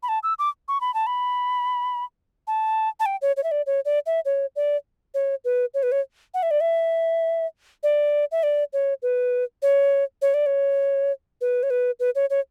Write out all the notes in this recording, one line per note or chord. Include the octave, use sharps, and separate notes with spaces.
B5
A5
E6
D6
C#6
B5
A5
B5
A5
A5
G5
C#5
C#5
E5
D5
C#5
D5
E5
C#5
D5
C#5
B4
C#5
B4
C#5
F#5
E5
D5
E5
D5
E5
D5
C#5
B4
C#5
C#5
D5
C#5
B4
C#5
B4
B4
C#5
C#5